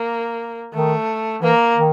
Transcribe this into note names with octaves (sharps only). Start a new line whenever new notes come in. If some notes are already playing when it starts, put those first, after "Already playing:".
Already playing: A#3
D#3 A3
E3 A#3
D#3